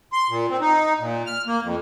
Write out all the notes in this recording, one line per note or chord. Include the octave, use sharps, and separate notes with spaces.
C6
A#2
C4
D#4
A#2
F6
A#3
F2